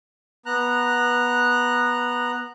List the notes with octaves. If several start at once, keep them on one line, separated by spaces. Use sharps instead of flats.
B3 A#5 F#6